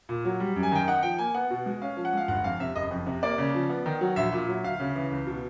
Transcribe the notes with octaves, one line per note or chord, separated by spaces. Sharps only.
A#2
F#3
G3
F#2
G#5
D#3 G5
D#4 F#5
F3 G5
A#3 G#5
B3 F#5
B2
G#3
C#4 F5
F3
F#5
G#3 F5
G1 F#5
F2 F5
C3 E5
F#1 D#5
F2
C3
A#3 D5
C#3
F3
B3
D#3
F#3
A#1 E5
A#2
F#3
D2 F5
C#3
E3
C#2
B2